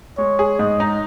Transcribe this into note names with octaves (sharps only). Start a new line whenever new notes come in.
G#3 C#5
G#4
G#2 D#5
D#4